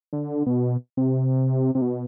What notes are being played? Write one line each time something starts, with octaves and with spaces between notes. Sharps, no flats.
D3
B2
C3
C3
B2